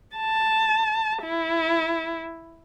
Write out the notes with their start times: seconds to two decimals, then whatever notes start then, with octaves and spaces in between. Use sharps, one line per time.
0.17 A5
1.22 E4